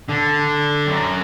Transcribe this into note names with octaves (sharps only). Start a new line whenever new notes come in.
D3
F#2